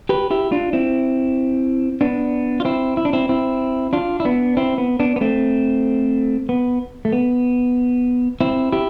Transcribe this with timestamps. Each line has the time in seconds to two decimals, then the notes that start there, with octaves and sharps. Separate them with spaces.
0.09 G4 B4
0.30 E4 G4
0.52 D4 F4
0.73 C4 E4
2.01 B3 D4
2.60 F4
2.65 C4 E4
2.97 E4
3.05 D4
3.13 C4 E4
3.29 C4 E4
3.93 D4 F4
4.20 E4
4.25 B3 D4
4.57 C4 E4
4.78 B3
4.99 B3 D4
5.16 B3
5.21 A3 C4
6.49 B3
7.05 A3
7.13 B3
8.41 C4 E4
8.72 E4 G4